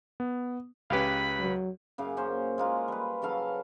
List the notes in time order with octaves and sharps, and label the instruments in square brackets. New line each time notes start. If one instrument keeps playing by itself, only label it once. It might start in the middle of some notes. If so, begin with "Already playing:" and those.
[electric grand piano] B3
[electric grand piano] C#2 B4 [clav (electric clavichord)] C#4 G4 F5 [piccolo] B5
[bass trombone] F#3
[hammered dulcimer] F#2 C#3 F5
A#3 C#4 C5
G#3 A#3 F4
G3 B4
C#3 F#3 A4 F5